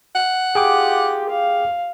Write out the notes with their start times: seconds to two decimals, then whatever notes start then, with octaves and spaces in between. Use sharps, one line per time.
0.15 F#5
0.55 F4 G4 G#4 G5 D6
1.30 F5